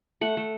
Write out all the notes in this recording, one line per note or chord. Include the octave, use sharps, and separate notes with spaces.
A3 F#5
A3